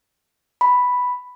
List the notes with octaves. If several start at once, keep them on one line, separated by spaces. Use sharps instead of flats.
B5